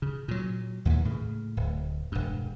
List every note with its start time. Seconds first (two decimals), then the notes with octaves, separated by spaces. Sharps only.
0.02 C#3
0.28 A#2 F#3
0.85 D#2 A#2 D#3 E3
1.05 A2 C#3
1.57 D1
2.12 E1 G2